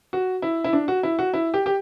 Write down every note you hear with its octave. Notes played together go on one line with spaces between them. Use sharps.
F#4
E4
E4
D4
F#4
E4
F#4
E4
G4
G4